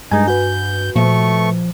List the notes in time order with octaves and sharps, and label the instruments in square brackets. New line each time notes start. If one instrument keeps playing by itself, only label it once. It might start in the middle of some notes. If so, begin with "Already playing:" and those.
[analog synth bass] G2 [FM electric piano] G3 G#3 [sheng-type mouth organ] D#4 [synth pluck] G#5
[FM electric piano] F#4 B4 [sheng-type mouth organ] G6
[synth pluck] A#2 [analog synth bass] F3 [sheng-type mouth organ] A3 C#6